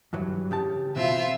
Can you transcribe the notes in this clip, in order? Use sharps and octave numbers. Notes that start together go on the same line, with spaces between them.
G2 E3 F#3
C#3 G4 A5
B2 E3 C4 F4 E5